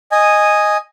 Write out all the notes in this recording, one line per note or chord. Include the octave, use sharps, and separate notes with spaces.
D#5 G#5